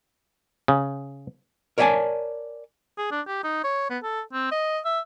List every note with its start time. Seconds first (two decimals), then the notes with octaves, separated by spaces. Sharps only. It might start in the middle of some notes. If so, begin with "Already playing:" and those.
0.68 C#3
1.78 A#4 C#5 D5 E5 G#5 A5
2.97 G#4
3.11 D4
3.27 G4
3.43 D#4
3.64 C#5
3.90 B3
4.03 A4
4.33 C4
4.51 D#5
4.85 E5